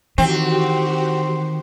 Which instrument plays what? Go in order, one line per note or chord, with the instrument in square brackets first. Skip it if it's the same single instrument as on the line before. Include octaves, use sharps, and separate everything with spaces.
[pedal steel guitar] D#3 [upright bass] E3 [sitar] C4 [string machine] F#4 G4